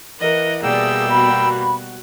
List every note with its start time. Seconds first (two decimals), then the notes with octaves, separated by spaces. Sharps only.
0.20 E3 A#4 D#5 F#5
0.63 B2 G3 A#3 G#4 D5 E5 G5 E6
1.10 B3 F#4 B5